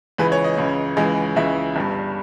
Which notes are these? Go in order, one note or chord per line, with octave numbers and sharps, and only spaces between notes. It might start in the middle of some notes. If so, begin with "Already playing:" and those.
C#2 C#3 E3 G#3 B4
C#5
D#5
C#2 C#3 E3 G#3
C#2 C#3 E3 G#3
C#2 C#3 E3 G#3 E5
G1 G2 G3